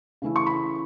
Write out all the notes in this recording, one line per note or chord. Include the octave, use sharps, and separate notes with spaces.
C#3 E3 A3 C#4 E4
C#6
B5